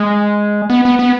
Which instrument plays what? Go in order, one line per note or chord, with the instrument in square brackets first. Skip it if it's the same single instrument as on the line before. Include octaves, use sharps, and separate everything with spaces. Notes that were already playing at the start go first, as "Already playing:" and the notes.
Already playing: [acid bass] G#3
B3
B3
B3